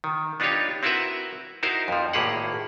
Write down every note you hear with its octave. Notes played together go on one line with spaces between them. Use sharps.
D#3
B3 D4 D#4 F4 G4 C#5
C4 E4 F#4 A#4 B4 E5
D#4 E4 F#4 A#4 C5
F2 F3
G#1 A2 A#3 G4 G#4 F#5